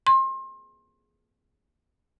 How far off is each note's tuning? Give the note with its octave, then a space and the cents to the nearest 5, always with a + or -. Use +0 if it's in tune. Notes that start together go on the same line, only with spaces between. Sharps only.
C6 +30